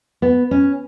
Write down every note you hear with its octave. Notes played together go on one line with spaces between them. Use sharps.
B3
C#4